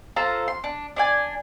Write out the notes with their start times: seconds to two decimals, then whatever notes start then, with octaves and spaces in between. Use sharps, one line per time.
0.16 F4 A4 C5 A#5
0.48 C6
0.64 D4
0.96 D4 D5 G#5